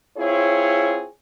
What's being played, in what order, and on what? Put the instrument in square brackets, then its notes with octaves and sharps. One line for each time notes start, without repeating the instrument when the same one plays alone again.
[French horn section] C4 E4 F4 G#4 C#5